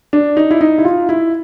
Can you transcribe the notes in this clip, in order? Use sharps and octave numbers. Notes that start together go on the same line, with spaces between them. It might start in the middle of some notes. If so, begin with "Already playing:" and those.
D4
D#4
E4
D#4
E4
F4
E4